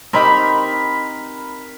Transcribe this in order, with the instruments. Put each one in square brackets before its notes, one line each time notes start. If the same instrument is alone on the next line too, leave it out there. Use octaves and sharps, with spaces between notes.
[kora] C4 D#4 G4 [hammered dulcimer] A#4 B5